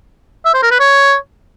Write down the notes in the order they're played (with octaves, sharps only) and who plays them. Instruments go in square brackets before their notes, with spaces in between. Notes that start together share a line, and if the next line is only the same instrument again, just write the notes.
[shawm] E5
C5
A#4
B4
C#5